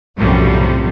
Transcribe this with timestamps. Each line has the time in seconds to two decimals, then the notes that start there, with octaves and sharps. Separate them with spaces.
0.17 B1 F#2 A2 C3 F3 G3